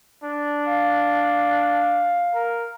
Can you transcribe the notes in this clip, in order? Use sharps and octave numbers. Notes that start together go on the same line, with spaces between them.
D4
F5
A#4